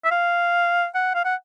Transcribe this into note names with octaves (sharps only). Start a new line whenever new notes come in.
E5
F5
F#5
F5
F#5